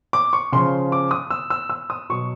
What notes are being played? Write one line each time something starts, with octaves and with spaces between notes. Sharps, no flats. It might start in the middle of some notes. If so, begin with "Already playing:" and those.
D6
C#6
C#3 F3 C6
D6
D#6
E6
E6
E6
D#6
B2 F#3 C#6